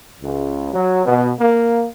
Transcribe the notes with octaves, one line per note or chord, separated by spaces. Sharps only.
C#2
F#3
B2
A#3